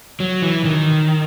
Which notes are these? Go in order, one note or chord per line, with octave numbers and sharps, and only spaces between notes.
F#3
E3
D#3